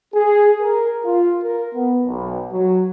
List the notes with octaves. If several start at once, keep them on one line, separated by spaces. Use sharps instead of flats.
G#4
A#4
F4
A#4
B3
B1
F#3